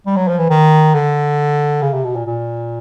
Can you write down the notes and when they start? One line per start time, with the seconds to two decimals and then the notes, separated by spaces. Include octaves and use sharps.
0.06 G3
0.16 F#3
0.28 F3
0.39 E3
0.50 D#3
0.94 D3
1.82 C#3
1.93 C3
2.04 B2
2.16 A#2
2.26 A#2